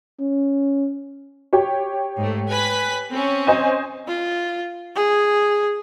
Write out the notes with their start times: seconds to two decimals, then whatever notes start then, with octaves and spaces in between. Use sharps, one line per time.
0.20 C#4
1.53 G4 C#5
2.18 G#2 A3
2.48 B4 G#5 B6
3.10 C4 C#4
3.47 C5 D#5 G#5
4.07 F4
4.96 G#4